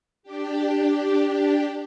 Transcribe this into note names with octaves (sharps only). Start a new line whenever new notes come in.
D4 G4